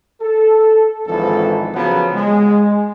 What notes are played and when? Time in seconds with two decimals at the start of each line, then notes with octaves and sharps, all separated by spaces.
0.21 A4
1.06 G#1 D3 E3 F3 A4
1.74 C#3 F3 F#3 B3
2.14 G#3